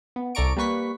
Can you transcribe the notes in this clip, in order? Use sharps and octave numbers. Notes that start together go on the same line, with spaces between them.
B3
C2 A4 D5 A#5 C#6 D7
G3 A#3 B4 C#6 B6